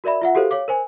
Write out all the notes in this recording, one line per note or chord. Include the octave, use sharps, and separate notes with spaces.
F#4 A#4 D5 E5 B5
F4 E5 F#5
F#4 G4 A4 A#4 C5 F5
C#5 F5 D6
A#4 C5 G#5